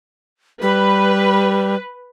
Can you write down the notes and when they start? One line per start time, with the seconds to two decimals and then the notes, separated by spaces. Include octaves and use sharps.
0.62 G3 B4